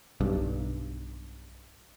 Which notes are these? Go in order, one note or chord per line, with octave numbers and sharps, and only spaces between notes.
B1 G2